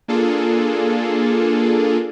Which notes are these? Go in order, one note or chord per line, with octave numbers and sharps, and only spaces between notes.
A#3 D4 F4 G#4 A4